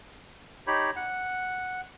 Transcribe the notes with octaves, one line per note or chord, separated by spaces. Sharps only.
D#4 G4 C#5 B5
F#5